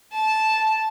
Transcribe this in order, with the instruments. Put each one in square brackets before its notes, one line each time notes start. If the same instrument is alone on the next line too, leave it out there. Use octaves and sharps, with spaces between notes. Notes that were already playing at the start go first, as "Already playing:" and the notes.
[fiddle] A5